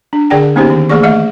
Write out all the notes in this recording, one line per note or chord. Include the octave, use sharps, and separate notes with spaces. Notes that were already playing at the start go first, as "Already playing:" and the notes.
D4
D3 G#4 D5 F#5 G5
A#3 B3 C#4 D#4 G4 C5
D#3
E3 A3 A#3 G#4 D5 C#6
A3 D#5 E5